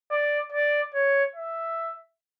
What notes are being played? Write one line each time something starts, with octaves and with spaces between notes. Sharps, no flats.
D5
D5
C#5
E5